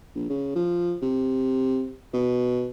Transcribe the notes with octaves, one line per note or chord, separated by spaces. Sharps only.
A#1
C#3
F3
C3
B2